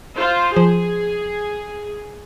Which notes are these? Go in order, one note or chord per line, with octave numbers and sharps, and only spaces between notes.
F4 C5
F3 G#4